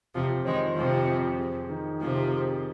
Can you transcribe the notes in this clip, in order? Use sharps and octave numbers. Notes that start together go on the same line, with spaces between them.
F2 C3 F3
D#3 G#3 C4
F2 C3 F3
F2
G#4
D#3
C3 F3 G#4